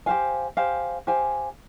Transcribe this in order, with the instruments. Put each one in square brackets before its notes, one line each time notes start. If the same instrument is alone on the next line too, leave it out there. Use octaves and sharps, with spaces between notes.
[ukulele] G4 C5 F5 G#5
G4 C5 F5 G#5
G4 C5 F5 G#5